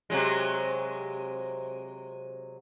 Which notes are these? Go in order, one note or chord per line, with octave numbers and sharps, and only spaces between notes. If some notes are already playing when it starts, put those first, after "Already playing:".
C3 F#3 G#3